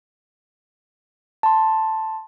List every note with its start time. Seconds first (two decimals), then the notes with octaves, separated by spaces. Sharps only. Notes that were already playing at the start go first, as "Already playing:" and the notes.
1.43 A5 C6